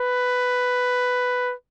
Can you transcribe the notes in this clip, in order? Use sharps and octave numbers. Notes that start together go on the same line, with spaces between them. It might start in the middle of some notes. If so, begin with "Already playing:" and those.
Already playing: B4